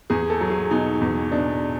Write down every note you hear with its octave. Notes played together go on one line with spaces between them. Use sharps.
E2 G#4
A4
F#3
G#4
B2 D#4
E2
B2 D4